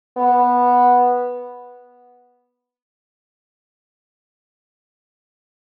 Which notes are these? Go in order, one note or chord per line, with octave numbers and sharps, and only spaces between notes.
B3